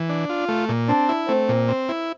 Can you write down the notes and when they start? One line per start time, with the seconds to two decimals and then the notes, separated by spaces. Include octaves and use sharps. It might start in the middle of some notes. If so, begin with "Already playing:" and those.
Already playing: E3
0.09 D4
0.29 F4
0.49 A3
0.69 A#2
0.88 C4 D4
1.09 E4
1.28 A3 C4
1.49 A#2
1.68 C4
1.89 E4